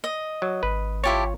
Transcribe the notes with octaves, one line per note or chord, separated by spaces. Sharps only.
D#5
F#3
G#1 B4
E4 F4 G4 C#5 A5